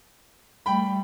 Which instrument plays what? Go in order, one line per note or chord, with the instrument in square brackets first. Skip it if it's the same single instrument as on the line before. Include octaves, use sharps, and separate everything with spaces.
[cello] G3 A3 [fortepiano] G5 B5